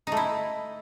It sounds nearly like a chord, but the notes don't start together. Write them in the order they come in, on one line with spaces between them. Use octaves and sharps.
D#4 A3 E4